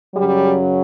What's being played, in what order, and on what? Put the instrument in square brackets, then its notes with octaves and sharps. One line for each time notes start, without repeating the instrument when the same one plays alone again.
[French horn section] F#2 C#3 F#3 G3